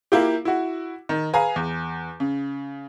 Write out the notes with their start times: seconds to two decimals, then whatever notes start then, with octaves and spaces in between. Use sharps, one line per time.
0.12 A#3 E4 F4 G4
0.45 E4 F#4
1.09 D#3
1.33 G#4 B4 F5 G#5 A#5
1.56 E2
2.20 C#3